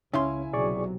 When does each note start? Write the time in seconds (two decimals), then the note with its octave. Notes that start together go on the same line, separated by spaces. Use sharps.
0.14 C#2 C#3 C#4 E4 E5 F5 G#5 C6
0.53 B1 C3 F#3 G#4 D5 C#6